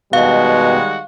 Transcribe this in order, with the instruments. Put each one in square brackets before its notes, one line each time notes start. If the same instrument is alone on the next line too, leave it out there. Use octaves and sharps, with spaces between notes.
[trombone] B2 [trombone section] D#3 G3 G#3 [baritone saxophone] F#4 [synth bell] F5